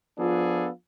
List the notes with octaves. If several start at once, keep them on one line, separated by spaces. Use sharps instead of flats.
F3 B3 D4 F4 G#4 A4